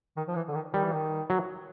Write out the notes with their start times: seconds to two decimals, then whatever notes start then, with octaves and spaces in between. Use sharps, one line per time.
0.17 D#3
0.28 F3
0.36 E3
0.48 D3
0.54 D#3
0.73 D#3 G3
0.84 E3
0.94 D#3
1.30 F#3